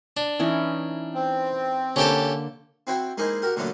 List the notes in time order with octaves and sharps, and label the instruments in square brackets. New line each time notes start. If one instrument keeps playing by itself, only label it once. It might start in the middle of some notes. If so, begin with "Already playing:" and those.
[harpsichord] D4
[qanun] E3 C#4 D#4
[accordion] C4
[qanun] D3 A#3 [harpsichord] C#4 G4 A4
[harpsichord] C4 E4 F#4 C5 G5
G#3 A#3 D#4 E4 G#4 C5
F#4 G4 A#4
A#2 D3 F#3 A3 B3 D4